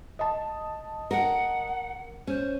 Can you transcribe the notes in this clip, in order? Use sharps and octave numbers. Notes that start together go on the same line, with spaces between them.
D#5 A5
A#4 F#5
C#4 C5